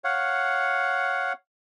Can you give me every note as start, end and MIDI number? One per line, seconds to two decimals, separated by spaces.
0.04 1.33 73
0.04 1.33 77
0.04 1.33 78